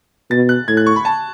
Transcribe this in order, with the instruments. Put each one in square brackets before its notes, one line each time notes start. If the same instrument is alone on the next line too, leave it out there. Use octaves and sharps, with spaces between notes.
[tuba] B2 [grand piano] A6
[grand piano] F#6
[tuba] A2 [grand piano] G#6
[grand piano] F#6
C#6
B5
A5